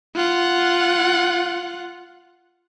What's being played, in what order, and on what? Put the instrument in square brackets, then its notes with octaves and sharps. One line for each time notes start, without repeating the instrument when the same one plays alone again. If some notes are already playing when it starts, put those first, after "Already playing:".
[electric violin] F4 F#5